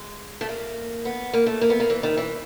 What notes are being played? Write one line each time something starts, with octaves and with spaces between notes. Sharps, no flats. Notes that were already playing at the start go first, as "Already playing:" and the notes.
Already playing: G#3
A3
A#3
B3
A#3
A3
A#3
B3
A#3
E3
D#3
E3